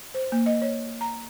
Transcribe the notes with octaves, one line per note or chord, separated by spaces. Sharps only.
C5
A#3
D#5
C#5
A#5